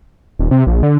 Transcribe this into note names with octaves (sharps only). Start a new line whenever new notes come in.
D#1
C3
A#1
D3